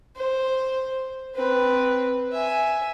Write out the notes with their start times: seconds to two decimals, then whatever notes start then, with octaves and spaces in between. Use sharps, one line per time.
0.16 C5
1.35 C4 B4
2.32 E5 G#5